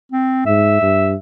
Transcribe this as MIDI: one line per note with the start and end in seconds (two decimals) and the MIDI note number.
0.12 0.43 60
0.46 0.80 44
0.46 1.16 76
0.82 1.15 43